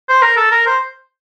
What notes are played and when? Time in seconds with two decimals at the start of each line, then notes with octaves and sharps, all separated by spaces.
0.08 C5
0.22 A#4
0.37 A4
0.51 A#4
0.66 C5